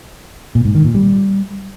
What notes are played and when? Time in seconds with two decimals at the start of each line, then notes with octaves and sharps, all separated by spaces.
0.55 A#2
0.65 G#2
0.75 D#3
0.85 A#2
0.95 G3